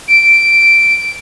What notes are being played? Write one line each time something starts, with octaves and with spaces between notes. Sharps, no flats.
D7